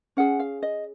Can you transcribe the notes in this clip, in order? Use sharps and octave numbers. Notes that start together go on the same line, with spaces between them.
C#4 G#4 F#5
F5
D#5